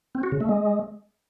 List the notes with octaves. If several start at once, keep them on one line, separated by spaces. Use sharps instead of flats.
C4
F#4
C#3
A3
G#3